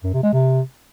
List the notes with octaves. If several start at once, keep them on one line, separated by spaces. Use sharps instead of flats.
F#2
C3
G#3
C3